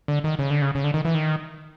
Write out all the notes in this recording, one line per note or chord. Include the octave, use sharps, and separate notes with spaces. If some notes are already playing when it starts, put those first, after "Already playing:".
D3
D#3
C#3
D3
C#3
C#3
D3
D#3
E3
D#3